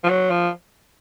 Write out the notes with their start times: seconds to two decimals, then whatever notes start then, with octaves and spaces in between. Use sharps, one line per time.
0.04 F3
0.09 F#3
0.30 F3